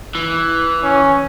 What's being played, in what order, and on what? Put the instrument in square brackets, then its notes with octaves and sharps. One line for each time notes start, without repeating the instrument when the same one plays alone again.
[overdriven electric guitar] E3
[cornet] C#4